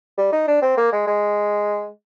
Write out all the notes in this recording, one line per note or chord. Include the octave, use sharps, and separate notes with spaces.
G3
D#4
D4
C4
A#3
G#3
G#3